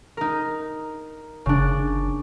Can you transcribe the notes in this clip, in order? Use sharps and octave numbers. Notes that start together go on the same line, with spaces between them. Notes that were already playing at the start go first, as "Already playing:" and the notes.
D#4 A#4
F#1 C#3 D4